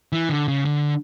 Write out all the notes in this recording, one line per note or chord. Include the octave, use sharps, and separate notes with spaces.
E3
D3
C#3
D3